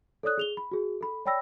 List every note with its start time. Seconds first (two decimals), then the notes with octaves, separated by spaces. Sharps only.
0.23 A4 C#5 D5 D#6 F#6
0.38 G#4 F7 G7
0.57 B5
0.71 F#4 G#4
1.01 A4 B5
1.26 C#5 D5 G5 B5 E6 A#6